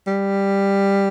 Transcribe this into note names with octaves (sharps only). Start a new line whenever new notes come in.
G3